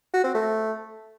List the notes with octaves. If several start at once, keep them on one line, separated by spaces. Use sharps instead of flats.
F#4
C4
A3